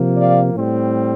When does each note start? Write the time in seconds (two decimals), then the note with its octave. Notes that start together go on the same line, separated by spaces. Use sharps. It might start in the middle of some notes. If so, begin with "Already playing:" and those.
Already playing: C3 F3 A#3
0.17 D5 F5
0.55 A2 G3 C4